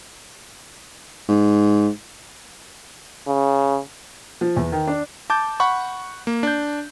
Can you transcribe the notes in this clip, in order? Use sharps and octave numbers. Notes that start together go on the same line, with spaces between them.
G#2
C#3
F3
E2
D#3
D4
A5 D6 G6
F#5 B5 C#6
A#3
D4 G6